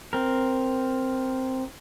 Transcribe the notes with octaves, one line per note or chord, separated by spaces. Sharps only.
C4 A#4